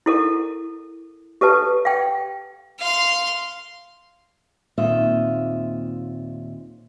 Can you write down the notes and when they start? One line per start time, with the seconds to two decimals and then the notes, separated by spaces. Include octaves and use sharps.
0.06 E4 A4 A#4
1.41 G4 A4 B4 A5
1.85 F5 G5
2.79 F5 C6
4.78 D#2 A#2 C4 F4 D#5 E5